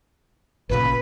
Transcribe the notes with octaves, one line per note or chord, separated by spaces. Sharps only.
A1 A#2 C#3 B4